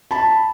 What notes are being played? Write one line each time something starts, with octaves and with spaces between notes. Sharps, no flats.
A5 B5